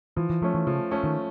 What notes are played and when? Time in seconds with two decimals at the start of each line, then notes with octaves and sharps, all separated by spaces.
0.17 E3 F3
0.30 E3
0.42 F3 A3 C#4
0.55 E3
0.67 C#3 F3
0.91 A3 C#4
1.04 D#3